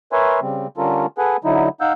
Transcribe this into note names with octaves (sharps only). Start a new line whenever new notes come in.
A#4 B4 C#5 E5 G#5 C6
C#3 G3 C4
D3 G3 C#4 F4 A4 A#4
G#4 A4 B4 F#5 G#5
D3 F#3 D#4 E4
D#4 F5 F#5 E6 G6